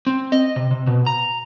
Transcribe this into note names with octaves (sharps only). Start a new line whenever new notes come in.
C4
D#5
C3
C3
B2
A#5